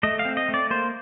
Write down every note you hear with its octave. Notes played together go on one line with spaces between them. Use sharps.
A3 D#5
F5
C4
D#5
A3
D5
A#3 C5